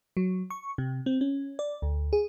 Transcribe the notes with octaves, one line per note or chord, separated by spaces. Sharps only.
F#3
C#6
C3
C4
C#4
D5
D2
G#4